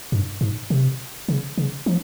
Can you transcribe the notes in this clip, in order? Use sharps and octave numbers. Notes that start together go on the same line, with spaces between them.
G2
G#2
C3
C#3
C#3
F3